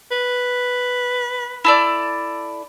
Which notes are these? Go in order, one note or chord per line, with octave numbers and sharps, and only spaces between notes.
B4
E4 A4 D5